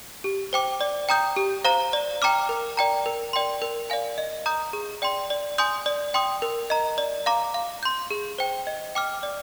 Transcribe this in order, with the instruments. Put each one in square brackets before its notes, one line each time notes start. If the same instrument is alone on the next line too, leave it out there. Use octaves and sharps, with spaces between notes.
[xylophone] G4
C5 G5 D6
D5
G5 A#5 D#6 G6
G4
C5 F5 A#5
D5
G5 A#5 D6 F6
A#4
D5 G5 A#5
A#4
D5 G5 C6
A#4
D5 F5 G#5
D#5
A#5 D#6 G6
G#4
D5 G5 C6
D5
G#5 C6 D#6 G6
D5
G5 C6 D#6
A#4
D#5 A#5
D5
F5 A#5 D6
F5
C6 G6
G#4
C5 G5
D#5
G5 D6 F6
D5